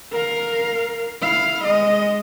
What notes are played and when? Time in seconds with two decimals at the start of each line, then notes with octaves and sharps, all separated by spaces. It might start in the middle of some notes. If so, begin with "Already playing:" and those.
0.12 A#4 F5
1.22 E4 F5
1.65 G#3 D#5